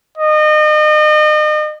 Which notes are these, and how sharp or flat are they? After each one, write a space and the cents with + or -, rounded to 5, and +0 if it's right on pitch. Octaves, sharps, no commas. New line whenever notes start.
D#5 -35